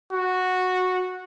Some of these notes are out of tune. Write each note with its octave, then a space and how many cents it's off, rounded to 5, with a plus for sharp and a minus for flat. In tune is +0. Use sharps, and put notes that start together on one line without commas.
F#4 -10